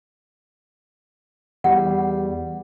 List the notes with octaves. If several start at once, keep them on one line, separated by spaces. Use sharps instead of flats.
E2 G3 F#5